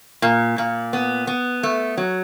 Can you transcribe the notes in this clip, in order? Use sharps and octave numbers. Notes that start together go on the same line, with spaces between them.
A#2
A#2
B3
B3
A3
F#3